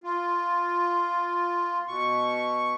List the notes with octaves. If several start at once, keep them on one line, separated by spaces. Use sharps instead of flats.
F4
B2 C#6